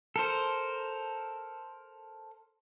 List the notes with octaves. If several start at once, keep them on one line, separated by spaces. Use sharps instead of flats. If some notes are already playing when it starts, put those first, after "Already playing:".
A4 A#4 C5